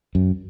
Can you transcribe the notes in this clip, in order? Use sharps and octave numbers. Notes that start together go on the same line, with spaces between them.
F#2